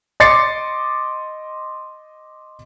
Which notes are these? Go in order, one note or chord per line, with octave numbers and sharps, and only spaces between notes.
D#5 C6 D6 A6 C7 C#7